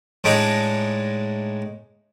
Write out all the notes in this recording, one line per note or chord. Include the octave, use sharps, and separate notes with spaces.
A2 G#3 D4 D#4